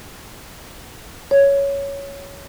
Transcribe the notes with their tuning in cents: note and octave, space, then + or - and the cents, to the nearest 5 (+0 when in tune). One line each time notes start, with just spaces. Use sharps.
C#5 +10